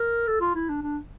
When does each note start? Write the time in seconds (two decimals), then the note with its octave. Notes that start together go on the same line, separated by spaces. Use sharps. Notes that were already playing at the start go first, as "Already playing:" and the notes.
Already playing: A#4
0.27 A4
0.41 F4
0.55 E4
0.69 D4
0.83 D4